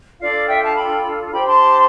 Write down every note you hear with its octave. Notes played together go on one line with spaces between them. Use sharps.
D4 F4 A4 D5 F5
E5 G5
F5 A5
G5 B5
D4 G4 C5 G5 B5
A5 C6